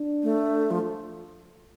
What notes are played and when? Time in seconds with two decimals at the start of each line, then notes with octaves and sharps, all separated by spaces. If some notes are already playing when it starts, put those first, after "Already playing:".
Already playing: D4
0.23 A3
0.71 F3